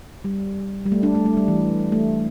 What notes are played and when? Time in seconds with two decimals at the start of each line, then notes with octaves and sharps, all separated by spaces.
0.24 G3
0.86 G3
0.92 A3
1.03 D4
1.15 A3
1.26 A3
1.37 G3
1.48 E3
1.92 A3